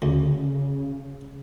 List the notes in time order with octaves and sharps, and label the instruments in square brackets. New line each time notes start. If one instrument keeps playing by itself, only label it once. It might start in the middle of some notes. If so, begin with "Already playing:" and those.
[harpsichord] D2 [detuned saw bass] C#3